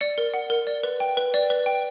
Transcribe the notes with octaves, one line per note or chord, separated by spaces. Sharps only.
D5 C#7
A#4
F#5
A#4
D5
B4
G5
B4
D5
B4
G5